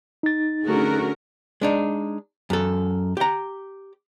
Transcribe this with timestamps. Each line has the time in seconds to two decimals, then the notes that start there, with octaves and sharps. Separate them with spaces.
0.23 D#4 A6
0.65 D3 A3 C#4 F#4 G#4 A#4
1.61 G#3 D4 D#4
2.50 F#2 A4
3.17 G4 A#5